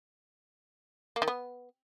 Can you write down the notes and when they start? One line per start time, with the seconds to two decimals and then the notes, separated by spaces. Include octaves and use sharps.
1.16 A#3
1.22 D#3
1.28 B3